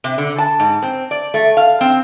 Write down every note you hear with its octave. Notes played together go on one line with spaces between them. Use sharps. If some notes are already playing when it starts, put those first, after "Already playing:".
C3
D3
A5
G#2
C4
D5
A3
F5
C4